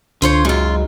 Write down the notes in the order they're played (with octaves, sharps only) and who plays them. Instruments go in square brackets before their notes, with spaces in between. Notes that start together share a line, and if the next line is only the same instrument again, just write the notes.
[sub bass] C#2 [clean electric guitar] D3 [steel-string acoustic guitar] F4 C5 C#5
[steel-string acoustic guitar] F#2 F4 [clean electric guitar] F#3 G#3 D#4